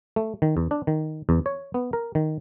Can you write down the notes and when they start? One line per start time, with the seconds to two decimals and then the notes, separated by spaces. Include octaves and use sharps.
0.16 A3
0.42 D#3
0.57 E2
0.71 D4
0.87 D#3
1.29 E2
1.46 C#5
1.74 B3
1.93 A#4
2.15 D#3